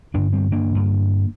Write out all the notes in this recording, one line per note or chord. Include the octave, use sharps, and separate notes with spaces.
G2 D3 A#3 D4
G3 C4
A#3 D4
G2 D3